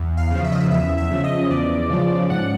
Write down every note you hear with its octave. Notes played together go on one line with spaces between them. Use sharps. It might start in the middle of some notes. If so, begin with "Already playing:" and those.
Already playing: E2
F5
C#3 F3
E5
D#5
E5
E2 E5
E5
C#3 F3
D#5
E2 D5
C#3 F3
G#2 F#5